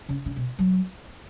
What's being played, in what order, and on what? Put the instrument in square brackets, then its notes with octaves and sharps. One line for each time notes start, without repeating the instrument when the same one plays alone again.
[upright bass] C#3
C#3
B2
F#3